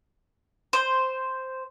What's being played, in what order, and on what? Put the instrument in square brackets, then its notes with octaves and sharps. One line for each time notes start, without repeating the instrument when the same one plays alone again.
[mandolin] C5